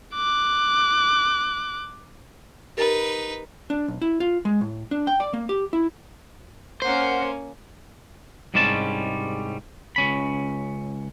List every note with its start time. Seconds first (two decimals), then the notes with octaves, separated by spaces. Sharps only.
0.14 D6 F#6
2.77 D#4 G4 A#4 B4 A6
3.70 D4
3.88 B1
4.02 E4
4.20 F4
4.45 G#3
4.61 A2
4.91 D4
5.07 G5
5.20 D5
5.33 A#3
5.49 G4
5.73 E4
6.82 A#3 C#4 A#4 C5 F#5
8.54 C2 G#2 G3 G#3 C#4 A5
9.96 C#2 C#4 B5